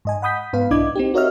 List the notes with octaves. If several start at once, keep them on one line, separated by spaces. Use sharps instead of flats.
G#2 D#5 G#5
F#5 B5 D#6 G6 B6
G#2 B3 B4 F5
B1 D4 E4 D#5 D6 G#6
C4 D#4 G4
F#4 A#4 C#5 D#5 E5 F6